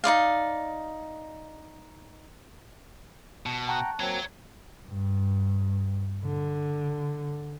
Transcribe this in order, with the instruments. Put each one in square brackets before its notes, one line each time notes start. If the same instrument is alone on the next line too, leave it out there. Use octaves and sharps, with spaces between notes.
[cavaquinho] D#4 E4 D5 F5
[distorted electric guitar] B2 [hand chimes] A5
[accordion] F#5 G5 A#5 [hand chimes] A5 C#6 F#6
[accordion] F#3 A#3 C4 [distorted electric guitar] C#5 A#5 [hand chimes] G#6
[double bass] G2
D3